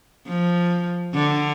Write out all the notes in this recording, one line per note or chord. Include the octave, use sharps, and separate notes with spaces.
F3
D3